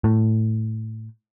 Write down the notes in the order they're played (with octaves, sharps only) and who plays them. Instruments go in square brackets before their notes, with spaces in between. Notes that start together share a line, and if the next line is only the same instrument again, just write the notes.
[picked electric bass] A2